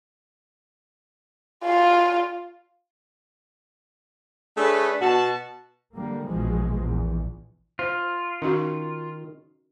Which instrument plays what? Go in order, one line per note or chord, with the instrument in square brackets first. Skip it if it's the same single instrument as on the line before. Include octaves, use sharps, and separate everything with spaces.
[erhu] F4
[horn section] A3 D4 G#4 A4 B4 C#5
B2 F#4 A5
[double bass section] D3 G3 A#3
A#1 B2 E3 F3 G#3
A#1 E2
[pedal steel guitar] F4 [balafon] C5
[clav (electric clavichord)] D#3 [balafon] C#4 D#4 F#4